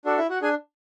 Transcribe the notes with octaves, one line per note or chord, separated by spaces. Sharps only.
D4 F#4 A4 D5
E4 E5
F#4 F#5
D4 G#4 G#5